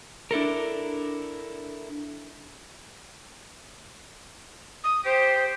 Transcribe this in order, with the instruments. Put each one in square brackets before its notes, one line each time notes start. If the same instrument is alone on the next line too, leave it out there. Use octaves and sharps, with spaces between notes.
[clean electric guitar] D4 E4 A4 A#4
[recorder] D#6
[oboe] G4 [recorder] C5